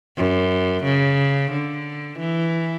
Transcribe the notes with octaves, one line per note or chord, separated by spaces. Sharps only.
F#2
C#3
D3
E3